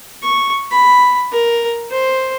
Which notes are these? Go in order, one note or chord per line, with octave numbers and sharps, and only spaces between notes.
C#6
B5
A#4
C5